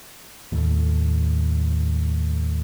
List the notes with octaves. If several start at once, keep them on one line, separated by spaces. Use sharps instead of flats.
D#2 A2